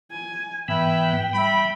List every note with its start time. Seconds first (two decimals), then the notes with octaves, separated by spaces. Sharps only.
0.11 G#5
0.68 G#2 E3 B3 B4 E5 G5 B5
1.33 G3 E5 B5